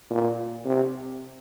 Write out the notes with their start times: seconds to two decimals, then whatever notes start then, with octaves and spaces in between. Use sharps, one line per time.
0.10 A#2
0.65 C3